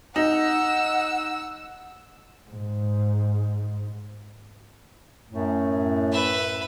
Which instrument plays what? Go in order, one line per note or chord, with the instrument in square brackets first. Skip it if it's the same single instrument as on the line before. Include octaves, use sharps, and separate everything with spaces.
[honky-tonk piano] D#4 [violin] F#5 E6
[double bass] G#2
[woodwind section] F#2 A2 A3
[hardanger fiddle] B4 E5